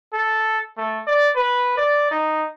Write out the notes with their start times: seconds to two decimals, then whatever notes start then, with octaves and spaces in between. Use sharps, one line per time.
0.13 A4
0.78 A3
1.07 D5
1.36 B4
1.77 D5
2.11 D#4